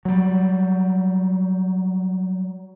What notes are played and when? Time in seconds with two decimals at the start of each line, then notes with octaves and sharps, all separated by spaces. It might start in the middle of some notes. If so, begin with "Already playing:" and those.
0.05 F#3 G3